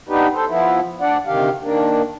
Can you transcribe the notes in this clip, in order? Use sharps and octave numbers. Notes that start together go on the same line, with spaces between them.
B3 D4 D#4 G4 B4
A4 C5
F3 B3 E4
D2 D4 D5 F#5
D2 C3 D#3 G4 F5
D#3 A#3 D4